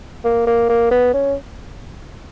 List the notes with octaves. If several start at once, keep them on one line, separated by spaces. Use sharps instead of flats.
A#3
A#3
A#3
B3
C#4